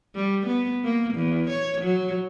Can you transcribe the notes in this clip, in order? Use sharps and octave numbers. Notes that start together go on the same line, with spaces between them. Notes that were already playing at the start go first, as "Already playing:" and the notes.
G3
B3
A#3
E2
C#5
F#3